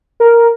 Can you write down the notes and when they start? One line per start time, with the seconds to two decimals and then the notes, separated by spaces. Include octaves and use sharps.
0.20 A#4